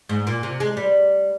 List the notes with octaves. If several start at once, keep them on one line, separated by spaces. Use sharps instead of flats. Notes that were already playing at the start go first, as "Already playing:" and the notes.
G#2
A#2
C3
G#3
G3